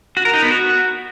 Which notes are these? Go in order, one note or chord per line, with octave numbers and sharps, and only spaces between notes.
F#4
A#4
D#4
B3
F#4